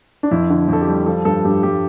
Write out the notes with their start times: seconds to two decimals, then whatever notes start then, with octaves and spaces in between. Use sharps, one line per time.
0.23 D4
0.31 F2 E4
0.50 D3
0.68 F2 A4
0.81 G4
0.88 G3
1.06 F3 A4
1.25 G2 A4
1.44 G2 G4
1.63 G2 G4